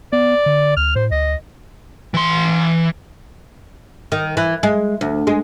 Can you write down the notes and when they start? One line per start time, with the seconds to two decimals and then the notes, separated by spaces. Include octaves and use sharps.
0.13 B3 D5
0.46 D3
0.77 D2 F6
0.96 A2 C5
1.11 D2 D#5
2.14 E3 C6
4.12 D#3
4.37 E3
4.63 G#3
5.01 D2
5.27 G#3